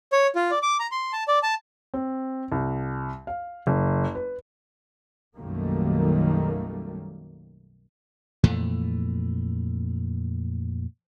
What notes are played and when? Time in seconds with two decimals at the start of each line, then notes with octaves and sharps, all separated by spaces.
0.13 C#5
0.36 F4
0.51 D5
0.63 D6
0.80 A#5
0.91 C6
1.13 A5
1.28 D5
1.43 A5
1.94 C4
2.52 C2
3.27 F5
3.67 F#1
4.15 B4
5.37 B1 F#2 D#3 G3 A3 A#3
8.44 F2 A#2 E3 A3